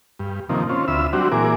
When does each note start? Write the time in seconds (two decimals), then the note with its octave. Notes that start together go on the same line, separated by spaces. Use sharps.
0.19 G2
0.49 C3 D#3 F3 A#3
0.69 C4 C#4 F4
0.88 D2 F4 E5 B5 E6
1.13 F#3 G3 C4 D4 F#4
1.32 A#2 E3 G#4 A#4 D6